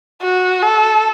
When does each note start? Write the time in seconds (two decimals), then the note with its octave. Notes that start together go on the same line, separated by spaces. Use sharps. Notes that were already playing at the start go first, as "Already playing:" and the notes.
0.22 F#4
0.63 A4